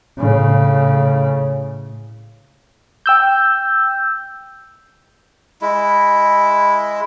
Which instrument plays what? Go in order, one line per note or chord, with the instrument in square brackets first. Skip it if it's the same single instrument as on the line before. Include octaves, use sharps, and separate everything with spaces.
[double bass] A2 C#3
[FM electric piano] G5 E6 G6
[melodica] G#3 E4